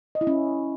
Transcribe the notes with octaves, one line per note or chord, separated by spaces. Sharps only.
D#5
E4
C#4